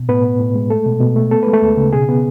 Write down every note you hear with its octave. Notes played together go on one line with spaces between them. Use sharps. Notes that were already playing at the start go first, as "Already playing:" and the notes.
Already playing: B2
A2 B3 B4
B3
A2
G#3
A3 A4
B2
B2
A3
B3 A4
G#3 B4
A3 A4
D2
C#3
B2 G#4
B3